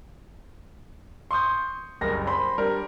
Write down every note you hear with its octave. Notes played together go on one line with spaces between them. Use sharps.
C6 C#6 D#6 G6
F#1 C2 A#4 A#6
C5 B5 C6
G3 D4 A#4